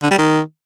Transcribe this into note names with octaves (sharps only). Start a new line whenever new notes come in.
D3
G3
D#3